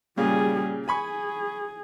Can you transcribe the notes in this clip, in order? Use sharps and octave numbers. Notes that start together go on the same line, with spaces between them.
A#2 C#3 G3 G#4
G#4 G#5 B5 C#6